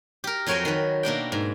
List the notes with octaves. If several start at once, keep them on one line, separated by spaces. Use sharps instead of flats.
G4 A#4
F2 F#3 A#4 C#5 G5 G#5
D#3 B4
B2 A#3 D4 G5
G#2